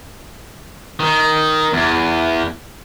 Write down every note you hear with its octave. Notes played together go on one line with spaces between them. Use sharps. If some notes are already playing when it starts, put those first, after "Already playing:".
D#3
E2